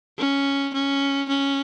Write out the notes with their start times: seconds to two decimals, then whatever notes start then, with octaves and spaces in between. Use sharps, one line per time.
0.18 C#4
0.74 C#4
1.29 C#4